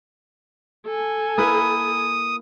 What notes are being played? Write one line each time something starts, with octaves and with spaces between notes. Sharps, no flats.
A4 G#5
A#3 E4 B4 D#6